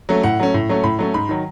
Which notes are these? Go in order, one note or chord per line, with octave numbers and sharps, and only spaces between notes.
F#3 A3 C#4
A2 F#5
F#3 A3 C#4
A2
F#3 A3 C#4
A2 B5
F#3 A3 C#4
G#2 B5
D#3 F#3